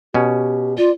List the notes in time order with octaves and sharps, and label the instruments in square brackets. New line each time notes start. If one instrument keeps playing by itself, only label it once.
[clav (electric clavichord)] B2 C#4 [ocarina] G4
[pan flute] F4 [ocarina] D5